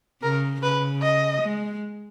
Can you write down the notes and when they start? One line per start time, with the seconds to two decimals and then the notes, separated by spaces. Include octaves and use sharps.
0.23 C#3 A#4
0.62 C#3 B4
1.02 D#5
1.42 G#3